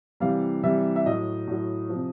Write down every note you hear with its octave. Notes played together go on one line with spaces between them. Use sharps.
C3 E3 G3 F5
C3 E3 G3 E5
E5
A2 F#3 D#5
A2 F#3
F3
C3